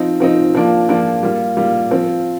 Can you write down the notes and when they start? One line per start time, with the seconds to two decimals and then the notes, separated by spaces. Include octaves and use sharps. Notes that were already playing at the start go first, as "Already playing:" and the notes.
Already playing: F3 C4 D#4
0.20 F3 C4 D#4
0.55 F3 A#3 D4 F4
0.89 F3 A#3 D4 F4
1.23 G3 A#3 F4
1.57 G3 A#3 F4
1.91 F3 C4 F4